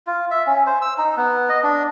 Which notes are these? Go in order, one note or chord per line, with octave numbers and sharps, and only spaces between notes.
F4
E5
C#4
C5
E6
D#4
B3
D#5
D4